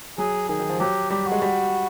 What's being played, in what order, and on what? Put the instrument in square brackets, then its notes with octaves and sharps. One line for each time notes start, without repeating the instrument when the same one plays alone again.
[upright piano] F#3 [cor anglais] G#4
[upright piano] D#3 [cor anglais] G#4
[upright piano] D#3
F3
[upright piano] F#3 [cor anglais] G4
[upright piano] G3 [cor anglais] G4
[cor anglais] F#4
[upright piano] G#3
[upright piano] G3 [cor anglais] F#4